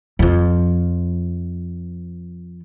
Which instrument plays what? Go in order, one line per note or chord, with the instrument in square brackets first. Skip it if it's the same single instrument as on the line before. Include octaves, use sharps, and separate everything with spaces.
[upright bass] F2 F3